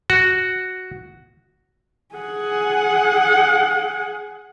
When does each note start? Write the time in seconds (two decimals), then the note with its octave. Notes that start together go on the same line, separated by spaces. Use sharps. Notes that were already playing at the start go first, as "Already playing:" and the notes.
0.10 F#4
2.15 G#4 F#5